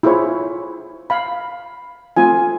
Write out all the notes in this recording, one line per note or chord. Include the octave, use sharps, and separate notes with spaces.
E4 F4 G#4 C5 C#5
F5 B5
A3 C4 F4 G#5